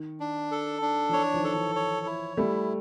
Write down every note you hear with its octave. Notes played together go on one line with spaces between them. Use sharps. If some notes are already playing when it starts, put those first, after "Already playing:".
Already playing: D#3
D4
A4
D4
F3
E3 C#5
D#3 F3
A4
E3
C#5
E4
G3 A3 E4